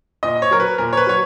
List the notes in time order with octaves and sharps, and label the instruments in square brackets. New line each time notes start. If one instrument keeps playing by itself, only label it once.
[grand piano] A#2 D#5
C#5
F#3 A#4
B4
A#2 A#4
C#5
B4
F#3 C#5